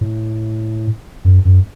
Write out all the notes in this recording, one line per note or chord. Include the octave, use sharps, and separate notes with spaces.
A2
F#2
F#2